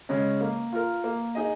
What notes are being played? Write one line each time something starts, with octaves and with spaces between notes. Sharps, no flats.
C#3 G#3 C#4
A#3
F4 A#4
A#3
D#4 G#4 D#5